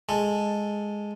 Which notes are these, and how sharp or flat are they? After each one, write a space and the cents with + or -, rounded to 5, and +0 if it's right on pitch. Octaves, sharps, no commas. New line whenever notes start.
G#3 -5 A4 +0